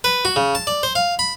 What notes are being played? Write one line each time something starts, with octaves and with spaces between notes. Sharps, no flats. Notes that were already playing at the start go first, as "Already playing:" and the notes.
B4
F#4
C#3
A5
D5
C5
F5
B5